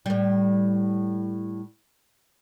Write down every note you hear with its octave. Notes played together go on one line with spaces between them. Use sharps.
A2 G3